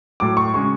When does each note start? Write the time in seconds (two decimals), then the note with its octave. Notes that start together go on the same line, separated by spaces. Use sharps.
0.20 A2 F#3 D6
0.37 C#6
0.54 C#3 G#3 C#6